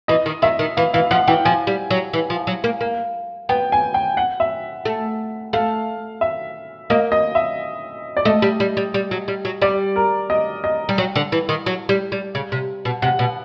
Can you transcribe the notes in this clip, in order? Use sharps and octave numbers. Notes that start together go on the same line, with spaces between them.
E3 D#5
D#3
D#3 E5
D#3
E3 F5
E3 F5
F3 F#5
E3 G5
F3 G#5
G3
F#3
E3
F3
F#3
A#3
A#3
B3 G5
G#5
G5
F#5
E5
A3
A3 F5
E5
A#3 D#5
D#5
E5
D5
A3 D#5
G3
G3
G3
G3
F#3
G3
F#3
G3 D5
A#4
D#5
D#5
G3
F#3
D3
E3
D#3
F#3
G3
G3
C#3
C3
B2
C3 F#5
B2